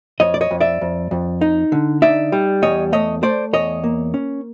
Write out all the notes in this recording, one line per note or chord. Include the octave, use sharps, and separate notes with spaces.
F2 C#5 D#5
D5
C#5 D#5
F2
D5 E5
F2
F2
D#4
D3
D#4 D5 E5
G3
E2 C#5 D#5
A3 C#5 D#5
A3 C5 D5
E2 C#5 D#5
A#3
C#4